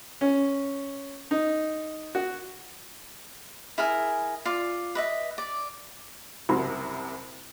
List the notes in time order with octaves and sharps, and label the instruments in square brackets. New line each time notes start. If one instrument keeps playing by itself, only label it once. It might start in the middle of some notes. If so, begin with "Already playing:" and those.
[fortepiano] C#4
D#4
F#4
[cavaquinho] E4 G#4 A#4 G#5
F4 D5
B4 D#5 E5
D5
[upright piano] F#1 C2 C3 F#4 C6